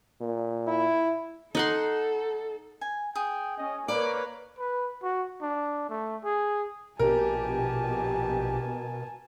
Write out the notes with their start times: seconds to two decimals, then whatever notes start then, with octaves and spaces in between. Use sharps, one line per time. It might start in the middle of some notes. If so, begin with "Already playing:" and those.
0.21 A#2
0.67 E4
1.55 D#4 A4 F#5 C6
2.81 G#5
3.15 G#4 G5
3.58 C#4 D#5
3.88 A#3 A#4 B4 C#5 D5
4.59 B4
5.03 F#4
5.42 D4
5.90 A3
6.24 G#4
6.99 A#1 B2 G4 A#4 G#5 A5